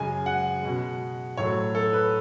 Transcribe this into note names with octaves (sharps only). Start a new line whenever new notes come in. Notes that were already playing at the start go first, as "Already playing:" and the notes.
Already playing: F#2 C#3 G#3 G#5
F#5
B2 G#3
A2 F#3 A3 C#5
A4
B4